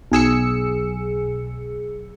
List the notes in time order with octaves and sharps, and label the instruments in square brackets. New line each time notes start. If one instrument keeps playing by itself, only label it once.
[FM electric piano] B1 G#4 E6 C#7